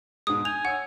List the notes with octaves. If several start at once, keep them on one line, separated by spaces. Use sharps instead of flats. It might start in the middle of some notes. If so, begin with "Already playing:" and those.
G#2 B2 G#3 D#6
G#5 G6 F7
C#5 F#5 E6